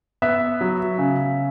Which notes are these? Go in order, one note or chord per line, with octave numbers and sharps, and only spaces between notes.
B3 E5
F#3
C#3